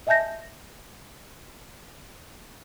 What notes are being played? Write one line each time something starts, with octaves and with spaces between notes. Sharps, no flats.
D#5 E5 G#5 A5 G6 A#6